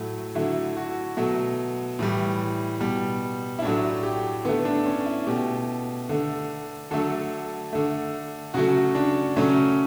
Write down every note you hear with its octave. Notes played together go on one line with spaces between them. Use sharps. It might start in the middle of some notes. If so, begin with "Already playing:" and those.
Already playing: A2 F#3 A3
D3 F#3 A3 E4
F#4
B2 F#3 A3
A2 E3 G3
B2 G3
E4
A2 F#3 A3 D4
G4
D3 A3 B3
D4
C#4
E4
B2 A3 G4
D3 A3
D3 F#3 A3 A4
D3 A3
C#3 F#3 A3 F#4
D4
C#3 F#3 A3 C#4